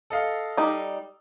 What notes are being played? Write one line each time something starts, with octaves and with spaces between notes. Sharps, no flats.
A4 D#5 F5
G3 D#4